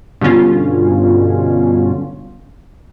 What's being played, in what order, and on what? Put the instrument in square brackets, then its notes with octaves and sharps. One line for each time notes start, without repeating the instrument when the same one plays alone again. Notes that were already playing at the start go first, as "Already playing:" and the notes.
[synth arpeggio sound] G2 B2 D3 C#4 F4